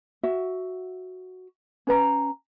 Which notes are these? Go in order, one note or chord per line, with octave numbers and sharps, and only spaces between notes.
F#4 E5
C#4 B4 A#5